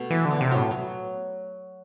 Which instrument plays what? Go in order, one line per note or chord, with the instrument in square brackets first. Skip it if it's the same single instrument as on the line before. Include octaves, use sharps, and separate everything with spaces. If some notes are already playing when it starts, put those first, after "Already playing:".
Already playing: [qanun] B2 A3
[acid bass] E3 [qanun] B3
[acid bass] D3
[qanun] B3
[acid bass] C3
[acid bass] A2 [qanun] F#3
[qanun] F#3